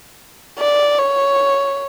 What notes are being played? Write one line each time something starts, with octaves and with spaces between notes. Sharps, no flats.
D5
C#5